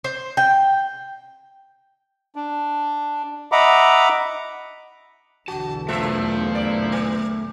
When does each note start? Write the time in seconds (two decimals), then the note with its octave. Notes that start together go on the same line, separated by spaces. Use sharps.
0.04 C5
0.37 G5
2.35 D4
3.52 D#5 E5 F#5 A#5 B5 D6
5.48 B1 E2 D3 F#4 A5
5.88 A#2 F3 A3 E4 F4 A4 E5
6.55 D5
6.92 A#3